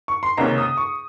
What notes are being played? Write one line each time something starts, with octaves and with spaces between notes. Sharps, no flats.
C#6
C6
C#2 C3 D#3 A#3 C#4 A#5
D#6
C#6